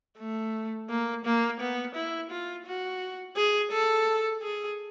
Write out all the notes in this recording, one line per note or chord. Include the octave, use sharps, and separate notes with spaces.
A3
A#3
A#3
B3
E4
F4
F#4
G#4
A4
G#4